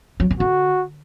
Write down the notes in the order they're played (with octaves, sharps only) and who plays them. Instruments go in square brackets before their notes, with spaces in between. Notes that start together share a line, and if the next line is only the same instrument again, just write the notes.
[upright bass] F#3
E3
[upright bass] D3 [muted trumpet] F#4